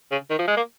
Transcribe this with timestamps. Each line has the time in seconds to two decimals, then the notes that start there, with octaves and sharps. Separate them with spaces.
0.12 C#3
0.30 D#3
0.39 F3
0.48 G#3
0.57 A#3